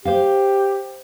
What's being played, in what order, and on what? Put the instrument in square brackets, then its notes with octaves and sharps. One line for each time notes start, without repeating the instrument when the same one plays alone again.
[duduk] G4 [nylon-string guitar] C5 F5